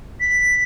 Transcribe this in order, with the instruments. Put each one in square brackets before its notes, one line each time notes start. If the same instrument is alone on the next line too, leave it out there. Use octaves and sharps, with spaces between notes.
[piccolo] B6